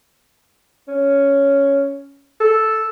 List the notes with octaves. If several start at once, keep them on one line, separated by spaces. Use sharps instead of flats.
C#4
A4